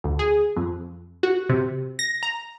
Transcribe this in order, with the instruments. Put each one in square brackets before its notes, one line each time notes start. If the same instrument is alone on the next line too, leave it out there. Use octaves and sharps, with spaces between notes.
[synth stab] D2
G#4
F2
F#4
C3
A#6
A#5